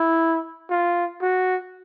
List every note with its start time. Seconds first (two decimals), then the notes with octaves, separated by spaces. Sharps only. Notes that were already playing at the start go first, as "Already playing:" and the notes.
Already playing: E4
0.70 F4
1.22 F#4